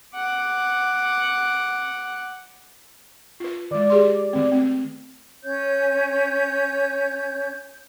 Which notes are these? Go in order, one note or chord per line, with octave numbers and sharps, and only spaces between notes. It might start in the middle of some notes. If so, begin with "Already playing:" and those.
F#5 D6
F4 B4
D#3 G#3 D5
G4 G#4 C6
D#3 A3 C4
C4
C#4 C#5 G6